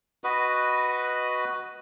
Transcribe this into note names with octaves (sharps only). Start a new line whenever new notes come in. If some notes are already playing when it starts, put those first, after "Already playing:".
F#4 B4 D#5